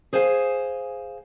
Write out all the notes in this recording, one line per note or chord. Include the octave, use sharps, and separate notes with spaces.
G#4 C5 F5 G#5